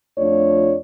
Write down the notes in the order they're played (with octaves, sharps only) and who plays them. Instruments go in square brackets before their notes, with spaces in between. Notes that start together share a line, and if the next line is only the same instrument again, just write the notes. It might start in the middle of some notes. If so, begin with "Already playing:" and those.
[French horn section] F2 A3 D4 F4 C#5 D5